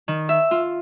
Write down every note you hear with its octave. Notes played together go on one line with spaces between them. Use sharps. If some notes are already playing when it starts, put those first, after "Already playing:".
D#3
E5
F4